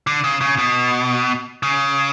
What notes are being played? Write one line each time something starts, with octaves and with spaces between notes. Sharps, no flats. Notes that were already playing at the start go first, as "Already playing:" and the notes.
D3
C#3
C#3
B2
C#3